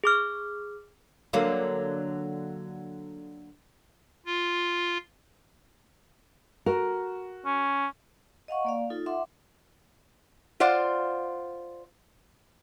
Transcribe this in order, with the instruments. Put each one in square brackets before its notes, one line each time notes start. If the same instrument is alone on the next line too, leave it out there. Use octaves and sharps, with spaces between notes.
[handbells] G#4 D6 F6
[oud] D3 F#3 A#3
[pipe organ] F4
[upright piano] F#4 [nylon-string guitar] A#4
[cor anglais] C#4
[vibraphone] D#5 F5 F#5 C#6
A#3 D5 F5
D#4 F4 A4
E5 F#5 C6 D6
[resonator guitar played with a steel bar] F4 C5 D5 F5 F#5